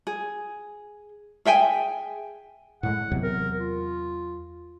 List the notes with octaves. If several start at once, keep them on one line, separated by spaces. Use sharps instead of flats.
G#4
G#4 E5 G5 G#5
A2 G#3 F#5
E2 C3 F#3
A#4
F4